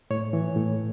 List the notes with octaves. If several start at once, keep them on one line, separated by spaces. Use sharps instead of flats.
A2 C#5
E3
A2